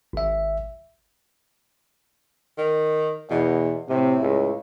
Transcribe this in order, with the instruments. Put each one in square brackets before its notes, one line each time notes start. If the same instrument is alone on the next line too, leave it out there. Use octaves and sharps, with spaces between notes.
[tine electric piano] G#1 E5
[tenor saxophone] D#3
[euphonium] E2 [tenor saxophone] B2
[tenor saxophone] A2 [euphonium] C3
[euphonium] C#2